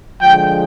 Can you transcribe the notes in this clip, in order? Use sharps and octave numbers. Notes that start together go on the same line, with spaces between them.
D3 F3 G#3 G5